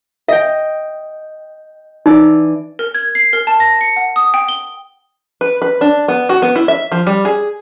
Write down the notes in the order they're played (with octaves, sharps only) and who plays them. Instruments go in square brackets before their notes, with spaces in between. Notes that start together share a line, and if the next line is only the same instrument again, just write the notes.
[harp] D#5 G5 [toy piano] E5
[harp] E3 D5 [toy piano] D#4
[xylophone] A#4
G#6
C7
A#4
A5
A#6
C#7
F#5
D#6
G5
G7
[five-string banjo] B4
B4
D4
B3
F#4
B3
E4
E5
F3
G3
G#4